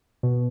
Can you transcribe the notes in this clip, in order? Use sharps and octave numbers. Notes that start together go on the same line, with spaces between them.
B2